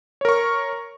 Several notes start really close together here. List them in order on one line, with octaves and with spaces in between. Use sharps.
C#5 A#4 C#6